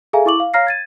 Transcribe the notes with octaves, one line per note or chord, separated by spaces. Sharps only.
G#4 A4 E5 F5 G#5 A#5
E4 C#6 D6 F#7
F5
C#5 F5 A#5 F6 A#6 C7
G#6 A6 D#7